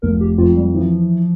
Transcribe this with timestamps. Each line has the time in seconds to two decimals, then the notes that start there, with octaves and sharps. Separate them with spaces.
0.02 F1 A#4
0.20 G4
0.38 F2 F4
0.56 G3
0.75 E3 F3